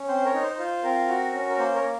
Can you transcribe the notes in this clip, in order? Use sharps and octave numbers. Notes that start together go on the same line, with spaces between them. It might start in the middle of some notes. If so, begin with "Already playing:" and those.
Already playing: C#4
C4 C5
A#4 C#5
D#4
C5
F4 C5
C4 A#4
F#4
C#4
A#4
A#3 C5
A#4 C#5
A#3